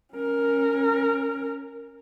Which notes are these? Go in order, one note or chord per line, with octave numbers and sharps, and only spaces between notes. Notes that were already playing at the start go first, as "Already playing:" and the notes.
C#4 A#4